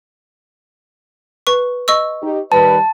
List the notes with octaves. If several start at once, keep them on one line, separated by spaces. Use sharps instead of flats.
B4 C#6
D#5 C#6 E6
D#4 G4
D#3 G3 B4 A5